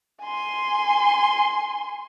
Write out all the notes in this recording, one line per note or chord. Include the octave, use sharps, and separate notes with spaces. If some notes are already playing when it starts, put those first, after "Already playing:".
G#5 C6